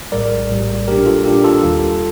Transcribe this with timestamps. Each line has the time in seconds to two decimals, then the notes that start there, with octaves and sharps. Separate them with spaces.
0.12 A#1 A2 G3 A#4 D5
0.49 A#1 A2 G3
0.87 A#2 G3 D4 G4 A#4
1.06 F4 A4
1.25 A#2 G3 D4 G4 A#4
1.44 F4 A4
1.63 D#2 D#3 G3